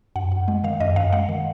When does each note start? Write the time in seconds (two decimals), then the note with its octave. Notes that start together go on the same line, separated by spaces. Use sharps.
0.16 F#2 F#5
0.32 F#2
0.48 G#3
0.64 D#3 F5
0.80 F#2 D#5
0.96 F#2 F5
1.13 G#3 F#5
1.29 D#3